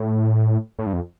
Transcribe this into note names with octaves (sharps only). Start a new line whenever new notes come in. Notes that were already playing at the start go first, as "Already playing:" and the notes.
Already playing: A2
A2
G2
F2